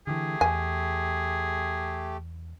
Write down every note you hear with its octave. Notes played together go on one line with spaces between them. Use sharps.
D3 E3 A3 G4 G#4
E2 G#5